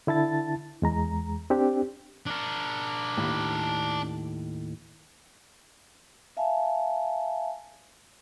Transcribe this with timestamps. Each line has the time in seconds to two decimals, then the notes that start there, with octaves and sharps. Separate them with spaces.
0.07 D3 E4 A5 A6
0.82 E2 G#3 A#5
1.50 C4 D4 G4
2.26 D4 A#4
3.18 D#2 A2
6.37 E5 F5 G#5 A5